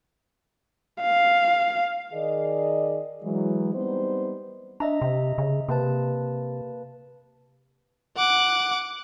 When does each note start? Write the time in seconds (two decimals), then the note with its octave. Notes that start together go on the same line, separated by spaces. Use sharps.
1.02 F5
2.13 D#3 G#4 A#4 D5 D#5
3.23 E3 F#3 G#3
3.74 G3 B3 C4 D#4 C5
4.80 D4 D#5 E5 A#5
5.02 C3
5.38 C#3
5.69 C3 A#3 B4 A5
8.17 F#5 D6